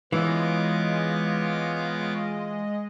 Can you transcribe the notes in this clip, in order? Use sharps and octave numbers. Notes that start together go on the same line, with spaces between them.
E3 G#3 B3 F4 C#5 D#5 D6